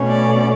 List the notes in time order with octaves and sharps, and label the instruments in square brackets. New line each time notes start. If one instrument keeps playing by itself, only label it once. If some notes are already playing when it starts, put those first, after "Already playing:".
Already playing: [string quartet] B2 A3 C#4
D5